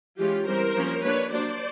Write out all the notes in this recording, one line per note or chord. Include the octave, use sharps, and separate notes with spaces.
E3 G#3 C#4 F4 G4
E3 G3 C4 A#4 C5
F3 A#3 C#4
G3 A#3 D4 B4 C#5
F#3 A#3 D4 C5 D5